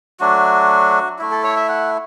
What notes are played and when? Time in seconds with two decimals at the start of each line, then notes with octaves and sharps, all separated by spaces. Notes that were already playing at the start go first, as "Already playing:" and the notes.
0.20 F#3 A3 D4 F#4
1.19 A3 E4
1.31 A4
1.44 C#5
1.56 E5
1.68 F#5